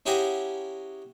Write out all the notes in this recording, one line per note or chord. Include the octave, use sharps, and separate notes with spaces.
C#4 E4 G4 G#4 F#5 A#5